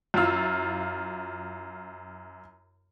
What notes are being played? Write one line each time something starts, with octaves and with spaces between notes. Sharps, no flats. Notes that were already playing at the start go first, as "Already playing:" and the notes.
F#2 E4 F4 E6